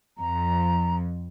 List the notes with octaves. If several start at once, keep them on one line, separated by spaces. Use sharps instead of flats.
F2 A#5